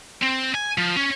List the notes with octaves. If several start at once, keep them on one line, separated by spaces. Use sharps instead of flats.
C4
G#5
F3
C#4